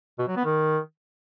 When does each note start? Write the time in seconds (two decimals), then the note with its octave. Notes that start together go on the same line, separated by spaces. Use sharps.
0.19 B2
0.28 F#3
0.36 B3
0.45 D#3